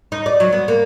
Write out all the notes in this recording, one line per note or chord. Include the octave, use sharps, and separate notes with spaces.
D#4
D5
F#3
B3
A#3